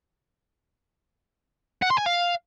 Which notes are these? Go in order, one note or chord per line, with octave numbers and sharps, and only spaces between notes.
F#5
C6
G#5
F5